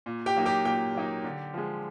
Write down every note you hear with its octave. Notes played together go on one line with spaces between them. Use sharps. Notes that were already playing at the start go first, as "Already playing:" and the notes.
A#2
G4 G5
F#3 A#3 D#4
G4 G5
A#2 G4 G5
F#3 A#3 D#4
D3
F3 G#3